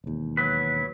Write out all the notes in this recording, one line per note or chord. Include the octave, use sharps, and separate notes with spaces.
E1 D#2
F#3 B4